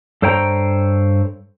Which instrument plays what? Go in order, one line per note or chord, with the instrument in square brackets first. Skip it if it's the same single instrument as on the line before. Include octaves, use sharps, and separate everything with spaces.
[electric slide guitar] G2 A4 C5 C#5 G5 A#5